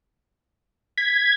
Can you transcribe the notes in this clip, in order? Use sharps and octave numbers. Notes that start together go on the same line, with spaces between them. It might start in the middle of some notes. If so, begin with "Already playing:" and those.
G#6 B6